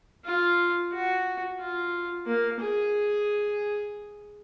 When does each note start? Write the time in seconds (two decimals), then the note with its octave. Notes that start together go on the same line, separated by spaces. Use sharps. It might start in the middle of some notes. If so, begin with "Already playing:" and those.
0.25 F4
0.93 F#4
1.60 F4
2.27 A#3
2.61 G#4